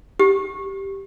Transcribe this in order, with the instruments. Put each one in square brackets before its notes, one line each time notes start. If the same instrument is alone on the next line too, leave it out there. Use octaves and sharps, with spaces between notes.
[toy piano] G4